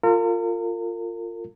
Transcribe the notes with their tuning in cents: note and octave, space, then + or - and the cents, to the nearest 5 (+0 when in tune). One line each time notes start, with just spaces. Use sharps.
F4 +0 A#4 -40